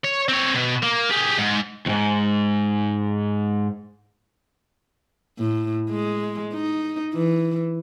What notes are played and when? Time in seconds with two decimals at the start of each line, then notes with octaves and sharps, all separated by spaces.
0.04 C#5
0.29 C4 C#5
0.55 B2
0.83 A#3
1.11 G4 G#4
1.39 G#2
1.86 D#2 G#2
5.39 A2
5.90 G#3
6.53 D#4
7.14 E3